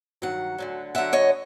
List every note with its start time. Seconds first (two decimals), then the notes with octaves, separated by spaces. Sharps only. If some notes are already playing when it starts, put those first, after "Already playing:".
0.22 G2 D#3 F#3 F#5
0.58 D2 D3 F#3
0.95 D2 D3 F#3 E5 F#5
1.13 C#5 D#5